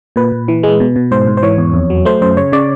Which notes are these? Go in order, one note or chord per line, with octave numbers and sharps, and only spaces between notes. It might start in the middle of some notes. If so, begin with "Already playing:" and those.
A#2 B4
A#2
E3
G#3
B2
B2
G#2 C5
G#2
C5
E3 C#5
E2
F2
F#3
A3 C5
F#2 C5
C#3 C#5
C#3 D5